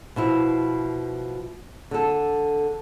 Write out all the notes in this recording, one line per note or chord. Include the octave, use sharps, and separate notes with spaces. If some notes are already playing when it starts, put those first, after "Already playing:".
B2 F3 E4
D3 A4